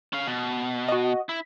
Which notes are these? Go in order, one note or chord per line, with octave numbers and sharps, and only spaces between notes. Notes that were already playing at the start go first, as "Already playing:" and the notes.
C#4 F5
B2
F#4 D#5
E4